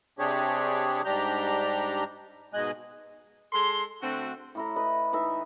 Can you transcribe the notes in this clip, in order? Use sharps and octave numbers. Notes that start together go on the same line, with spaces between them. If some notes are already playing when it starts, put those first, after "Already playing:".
C3 C4 D4 G4 G#4 C#5
G#2 G3 D4 G4 A#5 G6
G#2 B2 G#3 D#5 G#5 F#6
G#3 A4 C6
D3 A3 C4 F#4
A2 E4 A#5
B4 D#5
E3 D#4 D#5 E5